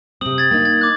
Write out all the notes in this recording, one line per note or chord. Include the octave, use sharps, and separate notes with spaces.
C3 C4 D#6 F#7
G#6 A6
A#3 D#4
G#6
D6 F#6